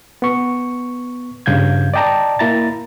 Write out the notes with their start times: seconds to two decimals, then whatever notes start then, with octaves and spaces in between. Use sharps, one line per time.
0.22 B3 C#6
1.46 G2 C#3 F5 G6 G#6
1.94 D5 D#5 G5 A5 A#5
2.39 A#3 E4 A#5 A6